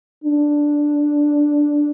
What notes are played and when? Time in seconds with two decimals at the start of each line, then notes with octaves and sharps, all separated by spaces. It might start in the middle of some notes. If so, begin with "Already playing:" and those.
0.24 D4